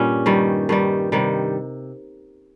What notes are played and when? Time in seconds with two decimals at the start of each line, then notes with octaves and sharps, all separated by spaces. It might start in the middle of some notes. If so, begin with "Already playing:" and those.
Already playing: G2 A#2 G3 C#4
0.26 G2 D#3 G3
0.69 G2 D#3 G3
1.12 C3 D#3 G3